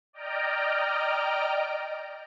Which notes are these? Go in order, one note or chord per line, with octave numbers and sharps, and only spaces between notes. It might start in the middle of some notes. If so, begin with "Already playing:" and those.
D5 D#5 G5 A#5 F6 D7